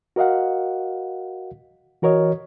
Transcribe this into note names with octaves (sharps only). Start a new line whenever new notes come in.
F#4 A#4 D#5 F5 F#5
E3 F#4 A#4 C#5 D#5